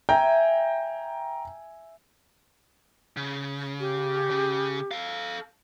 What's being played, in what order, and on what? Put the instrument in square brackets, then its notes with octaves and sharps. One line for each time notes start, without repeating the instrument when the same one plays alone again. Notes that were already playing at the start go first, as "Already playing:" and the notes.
[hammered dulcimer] E5 G#5 [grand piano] G5 A#5 G6
[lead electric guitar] C#3
[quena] G4
[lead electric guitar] C#3
A4 F5